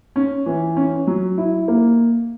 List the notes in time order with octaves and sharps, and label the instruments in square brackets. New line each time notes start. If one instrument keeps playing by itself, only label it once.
[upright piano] C#4
E3
C#4
F#3
E4
A#3